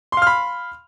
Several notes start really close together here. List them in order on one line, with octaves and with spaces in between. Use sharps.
C6 F5 F6 B5